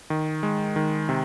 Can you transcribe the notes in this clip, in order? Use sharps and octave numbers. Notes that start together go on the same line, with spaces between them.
D#3
G#3
D#3
C3